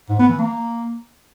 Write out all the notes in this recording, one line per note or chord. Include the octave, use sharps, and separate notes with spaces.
G#2
B3
E3
A#3